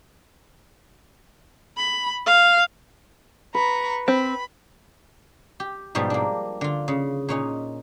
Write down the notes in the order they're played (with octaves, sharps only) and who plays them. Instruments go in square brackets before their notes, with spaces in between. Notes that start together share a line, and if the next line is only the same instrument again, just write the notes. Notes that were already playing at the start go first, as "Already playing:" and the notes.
[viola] B5
F5
[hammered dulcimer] B4 [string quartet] A#5 B5 C#6
[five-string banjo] C4 [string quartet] B5
[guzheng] G4
G#2 B2 F3 G3
A#3 D4
D3 F4
C#3
A#2 C#4 D#4